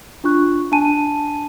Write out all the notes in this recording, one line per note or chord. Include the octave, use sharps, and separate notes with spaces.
D4 F4 C#6 F#6
D4 G#5 A5 D#7